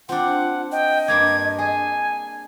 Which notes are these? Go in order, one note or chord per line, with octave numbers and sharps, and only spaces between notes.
C4 D4 F4 F#5
D#5 G5
G2 A#3 D4 G#6
G#4 G#5